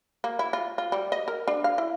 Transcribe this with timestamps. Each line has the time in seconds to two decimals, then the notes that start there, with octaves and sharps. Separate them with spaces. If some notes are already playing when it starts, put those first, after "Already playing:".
0.24 A#3
0.39 E4
0.53 F4
0.78 F4
0.92 G3
1.12 D#5
1.28 A#4
1.48 D4
1.64 F5
1.78 E4